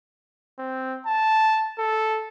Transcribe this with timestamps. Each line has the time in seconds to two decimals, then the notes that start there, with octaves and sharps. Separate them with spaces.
0.59 C4
1.06 A5
1.79 A4